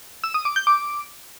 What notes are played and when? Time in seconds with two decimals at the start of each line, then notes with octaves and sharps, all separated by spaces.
0.24 E6
0.34 D#6
0.45 D6
0.56 G6
0.67 D6